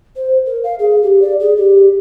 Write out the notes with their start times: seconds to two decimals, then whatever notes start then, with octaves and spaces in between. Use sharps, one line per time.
0.16 C5
0.46 A#4
0.63 F5
0.79 G#4
1.02 G4
1.22 D5
1.40 G#4
1.57 G4